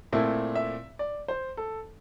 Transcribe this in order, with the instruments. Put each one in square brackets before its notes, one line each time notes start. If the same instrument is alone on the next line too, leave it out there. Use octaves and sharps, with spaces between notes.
[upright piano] A#2 A3 C4 E4
E5
D5
C5
A4